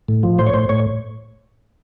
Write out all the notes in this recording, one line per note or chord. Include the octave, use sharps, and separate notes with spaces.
A2
F3
A2 C5
C#5
A2 C5
A2 C#5